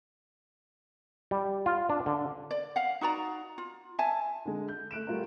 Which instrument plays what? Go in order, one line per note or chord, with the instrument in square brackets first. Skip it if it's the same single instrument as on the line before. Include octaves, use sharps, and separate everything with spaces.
[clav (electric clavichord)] G3
F4
D4
D3
[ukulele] D5
F5 F#5
D#4 F#4 D5 A#5
F4
E5 G#5 A5
[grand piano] D3 G#3
G6
A3 F#6 D7 E7
G3 A3 F4 F#4 A#4